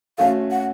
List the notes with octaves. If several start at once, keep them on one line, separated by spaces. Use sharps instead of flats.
A3 C#4 F#4 A4 F5
F#5